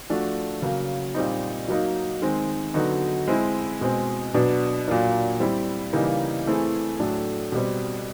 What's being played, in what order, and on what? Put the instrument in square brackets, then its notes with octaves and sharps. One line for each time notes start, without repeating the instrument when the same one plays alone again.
[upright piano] F3 A3 D4 F#4
C#3 F#3 A#3
A#2 G3 C4 D#4
F#3 A#3 D#4
D#3 G#3 C4
D3 F#3 B3 D#4 F#4
G#3 C4 E4
B2 G#3 C4
B2 F#3 B3 D4
A#2 F#3 A#3 D4
G3 C4 E4
C#3 E3 G3 A#3 D#4
E3 A3 C4 E4 G#4
A2 F#3 A3 D4
B2 G3 C4